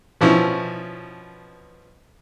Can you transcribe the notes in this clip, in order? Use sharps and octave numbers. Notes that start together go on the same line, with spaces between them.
B2 F3 C#4 E4